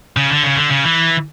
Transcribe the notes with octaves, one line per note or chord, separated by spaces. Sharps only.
C#3
D3
C#3
D3
C#3
E3